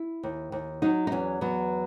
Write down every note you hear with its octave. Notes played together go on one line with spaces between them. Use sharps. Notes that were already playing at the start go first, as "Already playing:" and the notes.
Already playing: E4
D#2
D#2
F#3 D#4
D#4
E2 C#4
F#3 B3